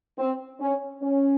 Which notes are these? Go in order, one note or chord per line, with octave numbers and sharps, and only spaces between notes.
C4
C#4
C#4